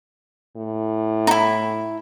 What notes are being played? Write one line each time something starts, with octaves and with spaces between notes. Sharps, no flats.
A2
D#4 E4